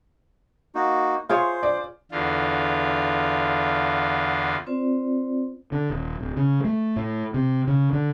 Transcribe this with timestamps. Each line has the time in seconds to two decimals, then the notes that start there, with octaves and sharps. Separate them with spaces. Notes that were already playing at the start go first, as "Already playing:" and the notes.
0.75 A#3 D#4 F#4
1.29 F4 G#4 C5 C#5
1.63 D5
2.12 E2 D3 F4
4.67 C4 F4 C5 D5
5.72 D3
5.90 D#1
6.20 D1
6.37 C#3
6.64 A3
6.96 A2
7.34 C3
7.67 C#3
7.93 D3